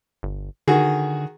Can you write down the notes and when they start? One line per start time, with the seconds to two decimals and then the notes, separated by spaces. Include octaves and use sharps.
0.23 G1
0.68 D3 D#3 F#4 G#4